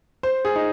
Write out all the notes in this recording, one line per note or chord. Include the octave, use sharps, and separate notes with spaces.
C5
G#4
D#4